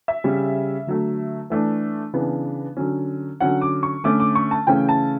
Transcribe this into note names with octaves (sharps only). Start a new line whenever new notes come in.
E5
C#3 G3 C#4
D3 F#3 A3
E3 A3 D4
C#3 E3 B3 D4
D3 F#3 C#4
D3 F#3 C#4 F#5
D6
C#6
D3 A3 C#4 D6
D6
C#6
A5
C#3 E3 A3 C#4 G5
A5